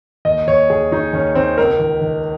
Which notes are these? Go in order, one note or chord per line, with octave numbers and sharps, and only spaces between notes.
D#2 D#5
D#2 C#5
D#2 G#4
D#2 D#4
D#2 C#4
D#3 C4
C#2 A#4
D#3
D#3